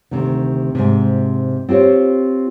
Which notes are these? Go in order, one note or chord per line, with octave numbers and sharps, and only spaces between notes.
D2 C3 D#3
G#2 C3
C4 F4 G4 C5 C#5